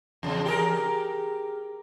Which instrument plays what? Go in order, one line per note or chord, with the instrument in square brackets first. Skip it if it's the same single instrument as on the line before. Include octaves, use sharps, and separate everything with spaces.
[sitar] E2 C#3
G4 G#4 A#4